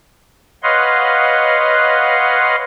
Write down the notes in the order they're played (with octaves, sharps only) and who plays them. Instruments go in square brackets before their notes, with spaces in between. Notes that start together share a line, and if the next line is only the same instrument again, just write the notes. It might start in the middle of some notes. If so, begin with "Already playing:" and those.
[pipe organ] B4 C#5 D#5 F5 F#5 C6